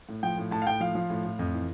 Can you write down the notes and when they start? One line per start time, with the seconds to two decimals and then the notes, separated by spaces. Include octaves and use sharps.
0.09 A2
0.23 F3 G5
0.38 A2
0.51 A2 A5
0.62 F5
0.66 A2 G5
0.80 F3 F5
0.95 F3
1.10 A2
1.25 A2
1.39 F2
1.54 E3